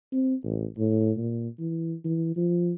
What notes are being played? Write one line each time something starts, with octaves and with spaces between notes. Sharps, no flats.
C4
A1
A2
A#2
E3
E3
F3